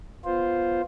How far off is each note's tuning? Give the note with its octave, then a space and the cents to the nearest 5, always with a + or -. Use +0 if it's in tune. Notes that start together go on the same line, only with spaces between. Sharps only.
B3 -5 F4 +0 C5 +0